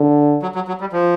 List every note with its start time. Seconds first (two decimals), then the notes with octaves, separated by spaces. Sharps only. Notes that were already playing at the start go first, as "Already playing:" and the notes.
Already playing: D3
0.42 F#3
0.55 F#3
0.68 F#3
0.80 G3
0.92 F3